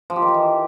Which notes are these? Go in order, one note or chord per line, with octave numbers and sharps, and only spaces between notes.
F3
G4
D#3
G4
E3